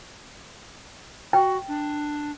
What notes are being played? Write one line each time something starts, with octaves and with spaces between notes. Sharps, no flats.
F#4 G5
D4